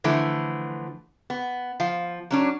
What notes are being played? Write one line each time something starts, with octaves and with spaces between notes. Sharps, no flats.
D3 E3 F3 A3
B3
F3 F5
F#3 C#4 D4